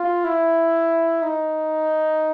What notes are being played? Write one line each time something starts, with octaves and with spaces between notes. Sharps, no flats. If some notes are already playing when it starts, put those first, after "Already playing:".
Already playing: F4
E4
D#4